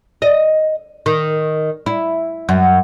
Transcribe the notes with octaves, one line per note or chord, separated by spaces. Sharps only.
D#5
D#3
E4
F#2